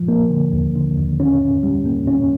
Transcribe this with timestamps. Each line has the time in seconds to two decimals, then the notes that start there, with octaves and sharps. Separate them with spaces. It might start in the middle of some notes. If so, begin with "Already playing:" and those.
Already playing: F3
0.08 A#3
0.30 D3
0.53 D#2
0.75 D3
0.97 D#2
1.20 C#4
1.41 C#4
1.63 G3
1.86 A#3
2.07 C#4